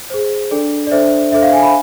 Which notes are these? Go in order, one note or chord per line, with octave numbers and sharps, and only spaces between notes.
G#4 C5
D4 A4 D5
D5
D4 A4 C5 E5
D4 A4 C5 E5
F5
G#5
B5